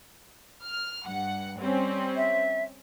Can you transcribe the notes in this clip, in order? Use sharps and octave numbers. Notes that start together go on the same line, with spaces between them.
F6
G2 F#5
G3 C4 C#4
E5